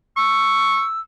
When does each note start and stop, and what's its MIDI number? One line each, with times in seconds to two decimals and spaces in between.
0.17 0.84 85
0.17 1.00 88